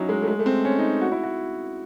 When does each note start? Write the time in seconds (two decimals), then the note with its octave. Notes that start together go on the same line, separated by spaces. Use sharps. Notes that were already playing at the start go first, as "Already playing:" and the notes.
Already playing: F#3 C#4 D#4 E4
0.09 G#3
0.22 A3
0.28 G#3
0.39 A3
0.46 C4
0.65 C#4
0.79 D#4
1.01 F#4
1.12 E4
1.23 F#4